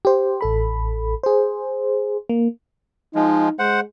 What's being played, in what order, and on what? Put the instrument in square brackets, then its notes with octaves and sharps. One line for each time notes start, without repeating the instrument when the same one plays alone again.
[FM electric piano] G4 C5
A1 A4 B5
G#4 C5
A#3
[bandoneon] F3 G#3 [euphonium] D#4
[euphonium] G#3 [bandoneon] C5 F#5